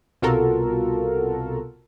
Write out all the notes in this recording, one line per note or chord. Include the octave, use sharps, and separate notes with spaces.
C2 B2 F4 F#4 A4 A#4